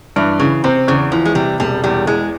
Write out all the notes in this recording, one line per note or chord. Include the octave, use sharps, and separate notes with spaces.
G2 E3
C#3 E3
C3 C4
E2 C#3
E3 F3
G#3
C3 G3
E1 G3
E2 G3
E3 G#3